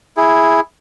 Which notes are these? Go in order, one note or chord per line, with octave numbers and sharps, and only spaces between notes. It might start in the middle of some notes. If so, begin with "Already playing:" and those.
E4 G#4